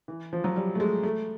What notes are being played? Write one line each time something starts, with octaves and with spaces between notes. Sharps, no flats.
E3
F3
F#3
G3
A3
G#3
A3